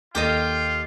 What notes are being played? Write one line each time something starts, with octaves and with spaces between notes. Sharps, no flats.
D#2 F4 G4 A4 A#4 D#5 G5